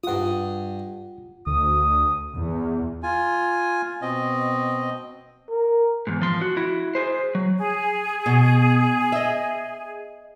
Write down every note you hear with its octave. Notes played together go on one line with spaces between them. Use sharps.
G2 F4 F#5 D#6
D2 D#6
E2
F4 G#5
B2 C4 D#5
A#4
E2 G#2
F3 C6
F#4
E4 F#4
G#4 C5
F#3
G#4
B2
D#5 E5